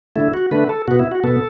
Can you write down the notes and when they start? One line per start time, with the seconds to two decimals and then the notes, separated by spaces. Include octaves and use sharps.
0.16 D3 A3 E4
0.34 F#4
0.51 D3 A3 B4
0.69 A4
0.88 B2 F#4
0.91 B3
0.99 E4
1.12 F#4
1.23 B2 B3 A4